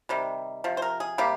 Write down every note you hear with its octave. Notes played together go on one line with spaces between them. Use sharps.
C3 D#3 G3
C3 F3
C5
A#4
G#4
C3 G3 A#3 G4